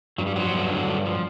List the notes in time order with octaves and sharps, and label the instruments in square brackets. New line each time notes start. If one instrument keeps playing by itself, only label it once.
[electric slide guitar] G2 F#3
G3
F3 F#3
G2
D3
G2
F3